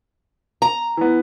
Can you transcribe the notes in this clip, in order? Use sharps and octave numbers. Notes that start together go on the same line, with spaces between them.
A#5
E3 B3